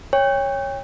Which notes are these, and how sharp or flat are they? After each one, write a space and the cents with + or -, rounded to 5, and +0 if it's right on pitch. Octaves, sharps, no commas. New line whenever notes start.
C#5 +0 G5 +35